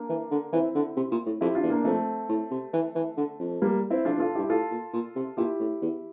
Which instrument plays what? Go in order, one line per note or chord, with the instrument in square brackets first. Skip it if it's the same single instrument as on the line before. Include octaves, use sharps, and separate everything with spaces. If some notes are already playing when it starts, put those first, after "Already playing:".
Already playing: [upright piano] A#3 D4
[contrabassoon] E3
D3
[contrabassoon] E3 [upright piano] C4 E4
[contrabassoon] D3
C3
A#2
A2
[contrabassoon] F2 [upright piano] E4 G4
[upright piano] D4 F4
[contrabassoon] E2
[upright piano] A#3 D4
[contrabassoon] F2 [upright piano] A3 C4
[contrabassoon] A2
C3
E3
E3
D3
F2
[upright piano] G3 A#3
C4 E4
[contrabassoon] F2 [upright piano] D4 F4
[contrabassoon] E2
[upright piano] F4 A4
[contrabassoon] G2 [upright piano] E4 G4
[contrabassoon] A2 [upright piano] F4 A4
[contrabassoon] A#2
A#2
C3
[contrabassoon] A#2 [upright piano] E4 G4
[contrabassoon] A2
E2